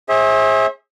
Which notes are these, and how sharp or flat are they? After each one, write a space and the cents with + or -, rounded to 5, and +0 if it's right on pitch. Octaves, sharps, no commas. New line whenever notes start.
G#4 -15 C5 +40 E5 -25